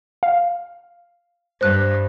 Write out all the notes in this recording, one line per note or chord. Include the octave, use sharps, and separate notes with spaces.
F5
G2 C5 F#6